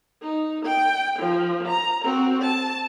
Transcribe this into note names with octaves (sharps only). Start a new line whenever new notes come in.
D#4
G5
F3
A#5
C4 F#4
A5